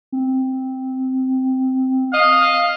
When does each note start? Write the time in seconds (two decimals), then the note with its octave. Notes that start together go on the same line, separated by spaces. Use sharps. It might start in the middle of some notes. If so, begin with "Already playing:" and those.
0.12 C4
2.13 D#5 F5